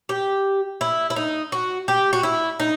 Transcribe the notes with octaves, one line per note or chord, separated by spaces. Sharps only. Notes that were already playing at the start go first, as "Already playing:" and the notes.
G4
E4
E4
D#4
F#4
G4
F#4
E4
D#4